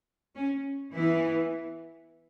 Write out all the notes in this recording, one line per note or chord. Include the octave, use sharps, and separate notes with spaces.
C#4
E3 B3 E4